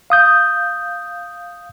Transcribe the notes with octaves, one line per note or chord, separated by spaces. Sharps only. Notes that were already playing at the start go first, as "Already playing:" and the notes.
F5 D#6 G6